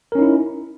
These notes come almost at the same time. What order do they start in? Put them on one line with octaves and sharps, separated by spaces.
A#4 C#4 D#4 E4